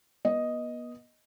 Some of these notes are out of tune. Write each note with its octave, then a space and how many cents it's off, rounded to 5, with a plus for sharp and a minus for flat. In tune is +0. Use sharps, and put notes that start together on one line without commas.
B3 -35 D#5 +0